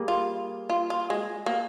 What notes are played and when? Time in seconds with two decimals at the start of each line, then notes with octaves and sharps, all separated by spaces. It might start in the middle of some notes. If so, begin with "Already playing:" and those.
Already playing: G3 A#3 G#4
0.08 F4
0.70 F4
0.90 F4
1.10 G#3
1.46 A#3